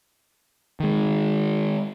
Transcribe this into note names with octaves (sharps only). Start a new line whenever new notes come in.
D#3 G#3